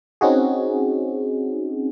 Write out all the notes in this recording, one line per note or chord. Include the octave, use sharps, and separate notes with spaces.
C4 C#4 D#4 F#4 G#4